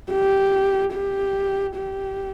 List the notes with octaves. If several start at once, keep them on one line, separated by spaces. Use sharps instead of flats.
G4
G4
G4